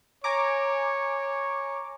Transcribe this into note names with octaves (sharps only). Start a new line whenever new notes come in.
C#5 G#5 A#5 D6